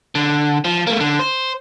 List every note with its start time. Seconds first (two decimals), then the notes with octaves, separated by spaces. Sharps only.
0.15 D3
0.65 F3
0.87 A3 A#3
1.00 D3
1.19 C5